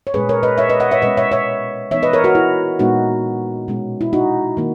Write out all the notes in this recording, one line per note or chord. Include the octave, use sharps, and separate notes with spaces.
C#5
A#2 G#3 C#4 G#4 B4
A#4 C#5
B4 D#5
C#5 E5
B4 D#5
D#5 F#5
C#5 E5
B2 G#3 C#4 B4 D#5
C#5 E5
C#5 E5
E3 B3 D#4 C#5 E5
B4 D#5
A#4 C#5
F#4 A#4
E4
A#2 G#3 B3 D#4 F#4
B2 G#3 C#4
E4
D#4 F#4
D#3 A#3 D#4